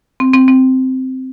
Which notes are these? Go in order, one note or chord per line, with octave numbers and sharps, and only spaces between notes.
C4
C4
C4